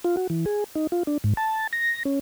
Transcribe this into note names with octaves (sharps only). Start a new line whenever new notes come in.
F4
F#4
E3
G#4
D#4
F4
D4
G#2
A5
A#6
C#4